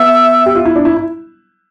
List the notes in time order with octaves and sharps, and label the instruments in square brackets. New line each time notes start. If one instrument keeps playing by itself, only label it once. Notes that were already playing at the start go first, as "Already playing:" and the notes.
Already playing: [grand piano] B3 [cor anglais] E5
[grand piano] G4
F4
E4
D4
E4
E4